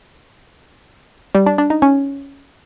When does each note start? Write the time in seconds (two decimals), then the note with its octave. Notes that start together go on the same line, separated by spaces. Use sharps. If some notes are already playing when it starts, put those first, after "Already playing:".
1.35 G3
1.46 D4
1.58 D4
1.70 D#4
1.82 C#4